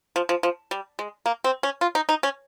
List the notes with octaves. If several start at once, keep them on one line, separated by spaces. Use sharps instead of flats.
F3
F3
F3
G3
G#3
A#3
C4
C#4
F4
D#4
D#4
C#4